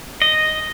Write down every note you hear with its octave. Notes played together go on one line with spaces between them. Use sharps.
D#5